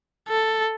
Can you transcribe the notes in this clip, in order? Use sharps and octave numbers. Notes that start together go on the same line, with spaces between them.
A4